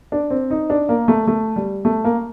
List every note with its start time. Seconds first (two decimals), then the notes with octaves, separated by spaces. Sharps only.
0.12 D4
0.30 C4
0.50 D#4
0.70 D4
0.89 A#3
1.08 A3
1.27 A3
1.56 G3
1.85 A3
2.04 A#3